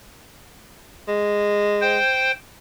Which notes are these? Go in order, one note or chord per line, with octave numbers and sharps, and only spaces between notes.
G#3
C5 G5